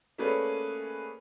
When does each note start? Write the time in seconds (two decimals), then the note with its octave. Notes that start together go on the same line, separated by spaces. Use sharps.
0.18 A3 A#3 C#4 G#4 B4 D5